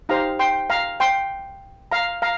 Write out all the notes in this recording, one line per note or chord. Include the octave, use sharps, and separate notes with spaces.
D#4 G4 C5 F5 A#5
G5 C6
F5 A#5
G5 C6
F5 A#5
F5 A#5